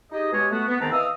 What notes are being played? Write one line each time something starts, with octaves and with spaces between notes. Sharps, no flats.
D#4 G4 G#4 D#5
B2 G#3 G4 C#5 D#5 G#5
A3 B3 F#4
B3
G#2 D#3 B3 C4 A5 A#5
E3 D#5 F5 D#6 E6